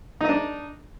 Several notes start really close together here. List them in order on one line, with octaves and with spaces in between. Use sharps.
D#4 D#5 D4